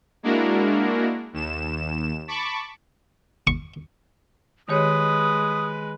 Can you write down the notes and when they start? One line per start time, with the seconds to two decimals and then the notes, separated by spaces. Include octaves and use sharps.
0.23 G#3 A#3 D4 E4 F#4 A#4
1.33 D#2 E7
2.28 A5 B5 C#6 D6
3.47 C#6
4.69 D#3 G#3 G4 B4 C#5 D#6